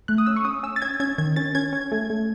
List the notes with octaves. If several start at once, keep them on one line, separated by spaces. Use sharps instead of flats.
A3 F#6
D#6
C#4 E6
C#6
C#4 D#6
C#4 E6
A6
C#4 G#6
C#4 G#6
D#3 G#6
C#4 A6
C#4 G#6
C#4
A3
A3